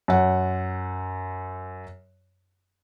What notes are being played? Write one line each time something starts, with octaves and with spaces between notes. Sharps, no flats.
F#2 F#5